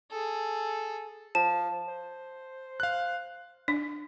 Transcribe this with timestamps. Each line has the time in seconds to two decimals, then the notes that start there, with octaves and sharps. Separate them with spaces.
0.11 G#4 A4
1.35 F3 A5
1.88 C5
2.80 F5 F#6
3.68 D4